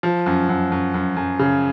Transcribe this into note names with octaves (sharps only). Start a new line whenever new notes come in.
F3
F#2
F#2
F#2
F#2
F#2
C#3